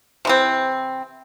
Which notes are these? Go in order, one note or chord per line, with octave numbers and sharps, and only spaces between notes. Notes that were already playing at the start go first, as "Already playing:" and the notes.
C3 E3 C4